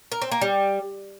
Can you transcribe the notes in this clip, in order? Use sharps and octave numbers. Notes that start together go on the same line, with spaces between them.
A#4
C4
A#3
G3